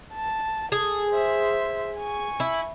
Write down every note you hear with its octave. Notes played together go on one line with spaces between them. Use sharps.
A5
G#4 A4
C5 E5
G#5 C#6
E4